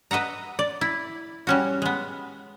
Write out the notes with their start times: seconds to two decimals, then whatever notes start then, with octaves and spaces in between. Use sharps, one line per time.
0.11 B4 D#5 E5 F#5 A#5
0.59 D5
0.81 E4
1.47 G3 C#4 F#4
1.82 G#3 B3